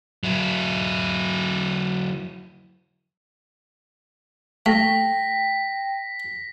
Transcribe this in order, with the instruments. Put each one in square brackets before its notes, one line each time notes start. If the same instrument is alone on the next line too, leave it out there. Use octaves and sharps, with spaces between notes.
[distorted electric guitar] F#3 E4
[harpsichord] A3 [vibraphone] G5 [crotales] A#6 B6